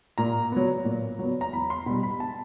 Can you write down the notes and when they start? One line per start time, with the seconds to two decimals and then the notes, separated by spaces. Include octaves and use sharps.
0.18 A#2 A#5
0.52 F#3 B3
0.85 A#2
1.19 F#3 B3
1.41 A#5
1.53 E2 B5
1.70 C6
1.86 B2 G3 B5
2.03 B5
2.20 A5